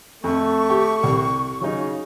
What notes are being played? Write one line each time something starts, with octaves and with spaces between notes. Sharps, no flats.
F2 A3 C#6
G4
C2 G3
C#3 F#3 D#4